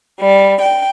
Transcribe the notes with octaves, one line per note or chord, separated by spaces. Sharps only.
G3
G5